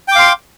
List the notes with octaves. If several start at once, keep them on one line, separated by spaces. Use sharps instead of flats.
F5 G5 C6 D6